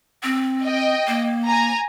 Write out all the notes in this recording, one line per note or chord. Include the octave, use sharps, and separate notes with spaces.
C4
D#5 G5
A#3
G#5 A#5